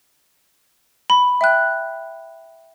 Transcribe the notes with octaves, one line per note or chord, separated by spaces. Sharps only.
B5
E5 G5 F#6